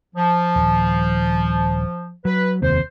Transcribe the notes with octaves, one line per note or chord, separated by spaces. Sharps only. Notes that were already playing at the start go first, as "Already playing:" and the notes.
F3
D#1
F#3 B4
F1 D#2 C3 C5